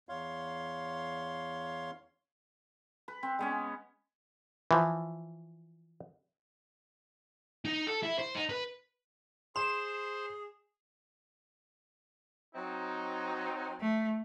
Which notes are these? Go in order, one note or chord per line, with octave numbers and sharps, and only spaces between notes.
E2 C#5 F5 C6
B4
C4
G#3 B3 C#4
E3 F3
D#4
A4
E4
C5
D#4
B4
G#4 C5 C6 E7
F#3 C4 D#4
A3